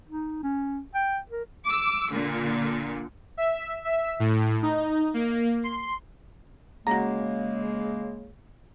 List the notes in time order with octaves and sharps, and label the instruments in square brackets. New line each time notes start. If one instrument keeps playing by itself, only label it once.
[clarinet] D#4
C#4
G5
A#4
[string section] D6 E6
A#2 D3
[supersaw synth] E5
E5
A2
D#4
A#3
C6
[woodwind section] C#3 G#3 A#3 [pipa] F#4 A#5